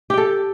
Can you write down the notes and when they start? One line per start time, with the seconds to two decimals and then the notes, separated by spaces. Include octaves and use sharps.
0.10 G4
0.14 G5
0.17 A4